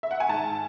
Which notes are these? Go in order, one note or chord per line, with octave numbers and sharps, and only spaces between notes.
E5
F#5
G#5
G#2 A5